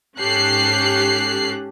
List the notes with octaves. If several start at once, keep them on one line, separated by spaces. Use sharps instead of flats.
G#2 C#4 G4 A4 F#6 C7